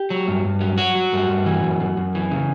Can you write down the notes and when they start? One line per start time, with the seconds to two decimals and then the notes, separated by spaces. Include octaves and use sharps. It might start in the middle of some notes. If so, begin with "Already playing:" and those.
Already playing: G4
0.10 F#3
0.28 G2
0.45 G2
0.61 F#3
0.78 F#3 F#4
0.95 F#3
1.13 G2
1.29 G2
1.46 E3
1.63 F#2
1.80 F#2
1.97 F#2
2.15 E3
2.31 C#3